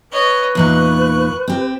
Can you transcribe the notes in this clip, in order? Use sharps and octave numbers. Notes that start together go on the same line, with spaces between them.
B4 C#5 D#5
E2 A#2 D#4 C#6 F#6
C4 G4